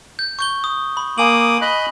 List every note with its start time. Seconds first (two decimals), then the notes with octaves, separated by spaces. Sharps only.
0.19 G6
0.39 C#6 G6 G7
0.64 D#6
0.97 B5
1.18 A#3 G#5 D6 D#6 F#7
1.61 D#5 B5 F#6